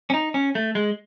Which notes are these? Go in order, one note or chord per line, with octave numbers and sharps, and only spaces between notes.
C#4
D#4
C#4
A3
G#3